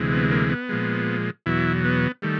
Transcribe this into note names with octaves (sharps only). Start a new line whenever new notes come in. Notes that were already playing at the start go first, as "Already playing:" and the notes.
Already playing: D2 C3 E3 G#3
B3
A#3
B3
A#2 F3 G#3
E2 B2 F#3 E4
B3
D#3 G3 A3